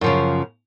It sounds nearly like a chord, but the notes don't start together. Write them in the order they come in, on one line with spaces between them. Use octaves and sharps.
F#2 F3 C#3